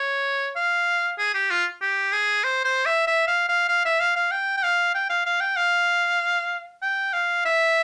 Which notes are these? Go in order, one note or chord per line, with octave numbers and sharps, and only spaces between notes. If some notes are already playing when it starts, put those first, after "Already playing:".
Already playing: C#5
F5
G#4
G4
F4
G4
G#4
C5
C5
E5
E5
F5
F5
F5
E5
F5
F5
G5
G5
F5
G5
F5
F5
G5
F5
G5
F5
E5